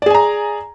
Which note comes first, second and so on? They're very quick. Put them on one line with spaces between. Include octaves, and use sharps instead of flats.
D5 G#4 G#5 A#5